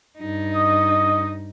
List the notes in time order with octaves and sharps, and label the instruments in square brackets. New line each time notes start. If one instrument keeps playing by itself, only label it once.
[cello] G2 D#4
[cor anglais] D#5